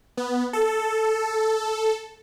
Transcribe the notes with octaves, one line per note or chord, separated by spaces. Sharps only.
B3
A4